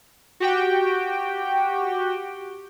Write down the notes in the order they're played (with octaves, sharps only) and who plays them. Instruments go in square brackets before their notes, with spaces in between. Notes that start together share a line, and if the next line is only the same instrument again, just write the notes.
[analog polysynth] F#4 G4 G5